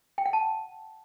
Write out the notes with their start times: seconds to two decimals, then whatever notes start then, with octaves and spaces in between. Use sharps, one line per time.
0.18 G5
0.26 F#5
0.33 A5